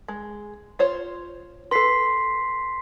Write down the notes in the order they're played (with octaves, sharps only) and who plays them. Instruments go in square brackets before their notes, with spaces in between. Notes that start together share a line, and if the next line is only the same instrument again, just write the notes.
[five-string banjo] G#3
F4 C5 C#5
[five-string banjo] A4 B4 [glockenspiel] C6 B6 C7